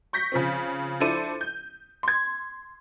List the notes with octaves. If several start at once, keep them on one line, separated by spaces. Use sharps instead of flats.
C#6 G6 A#6 B6
C#3 F3 C4
F3 D4 E4 A4 C5 D#7
G6
C6 G#6